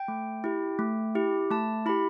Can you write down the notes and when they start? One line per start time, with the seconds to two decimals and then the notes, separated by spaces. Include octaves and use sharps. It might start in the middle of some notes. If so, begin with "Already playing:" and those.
Already playing: G5
0.08 A3
0.44 E4 G4
0.79 A3
1.15 E4 G4
1.51 A3 A5
1.86 E4 G4 B5